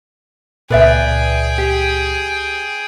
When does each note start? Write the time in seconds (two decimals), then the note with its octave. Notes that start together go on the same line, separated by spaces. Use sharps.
0.70 C#2 A#2 G#4 B4 D5 E5 G5
1.58 G4